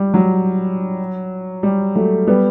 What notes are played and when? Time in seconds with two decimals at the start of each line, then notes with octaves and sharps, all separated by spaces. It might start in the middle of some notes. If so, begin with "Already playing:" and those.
Already playing: G3
0.14 F#3
1.63 G3
1.95 F#3 A3
2.27 G3 B3